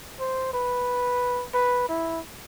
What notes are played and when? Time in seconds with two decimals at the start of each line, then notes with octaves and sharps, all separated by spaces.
0.20 C5
0.53 B4
1.54 B4
1.89 E4